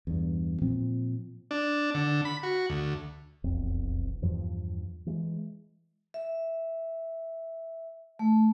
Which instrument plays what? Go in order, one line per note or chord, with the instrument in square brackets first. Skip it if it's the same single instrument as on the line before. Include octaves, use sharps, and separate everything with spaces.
[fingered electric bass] E2 G2
A#2 F3 C4
[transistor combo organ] D4
D3
B5
F#4
D2
[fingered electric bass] E1 B1 F2 C4
E2 G2 F3
E3 G#3
[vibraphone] E5
A3